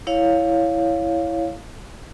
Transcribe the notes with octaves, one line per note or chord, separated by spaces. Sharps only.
E4 C#5 F5